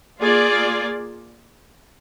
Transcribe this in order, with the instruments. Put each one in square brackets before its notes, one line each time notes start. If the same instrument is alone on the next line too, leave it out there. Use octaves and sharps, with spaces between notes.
[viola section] A#3 F4 G#4 D5